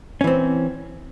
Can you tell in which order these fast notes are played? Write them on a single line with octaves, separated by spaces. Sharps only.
C#4 E3 C4